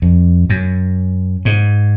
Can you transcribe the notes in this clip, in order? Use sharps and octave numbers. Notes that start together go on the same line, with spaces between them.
F2
F#2
G#2